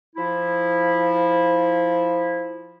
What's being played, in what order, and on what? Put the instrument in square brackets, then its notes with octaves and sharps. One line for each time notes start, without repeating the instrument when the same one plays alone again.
[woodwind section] F3 E4